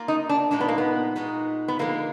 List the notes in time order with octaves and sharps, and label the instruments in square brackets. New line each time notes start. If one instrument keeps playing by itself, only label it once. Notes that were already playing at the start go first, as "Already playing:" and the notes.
Already playing: [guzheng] A#3 F4 A#4 D5
[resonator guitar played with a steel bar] D#4
D4
[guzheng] A#2 G#3 D#4 F#4 B4 [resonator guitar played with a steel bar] D4
[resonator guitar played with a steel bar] B3
A#3
B3
[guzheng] A#2 G#3 D#4 F#4 B4
[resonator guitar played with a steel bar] B3
[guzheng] D3 F3 G#3 [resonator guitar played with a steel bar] A#3